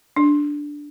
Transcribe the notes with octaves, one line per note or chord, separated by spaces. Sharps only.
D4